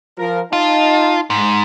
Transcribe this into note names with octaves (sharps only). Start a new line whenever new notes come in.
F3 A#4
D#4 F4 D#5 A5
G#2